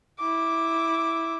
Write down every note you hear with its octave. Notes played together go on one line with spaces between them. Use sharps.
E4 D6